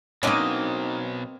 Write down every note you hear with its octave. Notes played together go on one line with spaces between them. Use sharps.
B2 F#3 A#3 C4 C#4 D#4 D#5